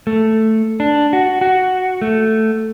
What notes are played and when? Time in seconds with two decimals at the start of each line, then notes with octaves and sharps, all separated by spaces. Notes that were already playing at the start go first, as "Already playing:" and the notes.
0.07 A3
0.80 D4
1.13 F#4
1.41 F#4
2.02 A3